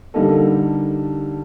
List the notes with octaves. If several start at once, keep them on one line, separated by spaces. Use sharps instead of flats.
D3 G3 A#3 D#4 A4